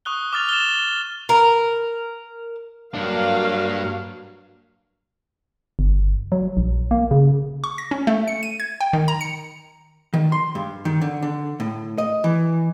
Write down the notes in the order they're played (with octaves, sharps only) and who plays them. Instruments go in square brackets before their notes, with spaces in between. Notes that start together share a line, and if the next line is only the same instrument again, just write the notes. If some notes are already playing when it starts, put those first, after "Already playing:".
[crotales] C#6 D#6 F#6 G7
D6 F6 A6 F7
E7 G7
[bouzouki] A#4
[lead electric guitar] G2 D4 [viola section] F#3 A#3 F5
[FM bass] G1
F#3
A#1
A#3
C#3
[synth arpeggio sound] C#6
A#6
C#4
A3
C#7
D#7
G#6
G5
D#3
A#5
C#7
[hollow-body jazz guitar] D#3
C6
G2
D#3
D3
D3
A2
D#5
E3